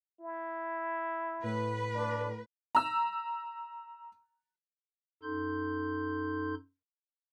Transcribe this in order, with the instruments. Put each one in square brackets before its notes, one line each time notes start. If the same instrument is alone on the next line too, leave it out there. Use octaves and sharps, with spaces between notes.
[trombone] E4
[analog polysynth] A2 [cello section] B4
[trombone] D4
[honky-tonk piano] A#5 E6
[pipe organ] F#2 D#4 A4 C6 G6